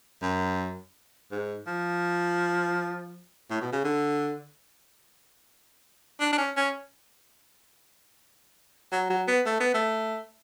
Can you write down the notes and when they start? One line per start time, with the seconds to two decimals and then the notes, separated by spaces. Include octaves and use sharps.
0.22 F#2
1.31 G#2
1.67 F3
3.50 A2
3.61 B2
3.72 C#3
3.84 D3
6.20 D4
6.32 D4
6.38 C#4
6.56 C#4
8.92 F#3
9.10 F#3
9.28 B3
9.46 A3
9.60 B3
9.74 A3